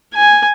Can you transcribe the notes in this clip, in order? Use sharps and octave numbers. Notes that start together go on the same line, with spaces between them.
G#5